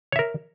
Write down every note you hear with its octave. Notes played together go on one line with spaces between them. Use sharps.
A#4 C#5 E5